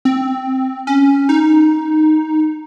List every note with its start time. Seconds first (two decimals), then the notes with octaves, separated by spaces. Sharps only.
0.05 C4
0.87 C#4
1.29 D#4